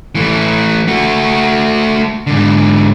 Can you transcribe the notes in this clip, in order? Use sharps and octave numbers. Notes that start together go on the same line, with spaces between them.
E3 A3
A3 F#4
G#2 D3